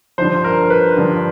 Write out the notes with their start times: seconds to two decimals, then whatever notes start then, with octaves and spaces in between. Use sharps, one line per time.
0.18 G2 D3 F3 C5
0.44 A#4
0.70 B4
0.97 G2 D3 F3